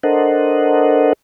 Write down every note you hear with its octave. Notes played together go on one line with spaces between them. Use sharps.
D4 A4 A#4 C5 D#5 F#5